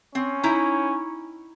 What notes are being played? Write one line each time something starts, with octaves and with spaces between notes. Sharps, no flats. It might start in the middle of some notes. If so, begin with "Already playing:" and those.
C4 C#4
D#4 E4 A#5